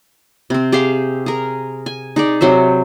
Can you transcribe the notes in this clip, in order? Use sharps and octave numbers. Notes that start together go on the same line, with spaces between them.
C3 C4
G4 G#4 C5 F5
G#4 A#4
G#5
D#4 G#4 D5
C3 F#3 C5 E5